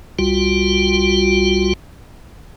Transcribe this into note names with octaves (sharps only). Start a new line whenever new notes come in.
C2 G3 F4 F#4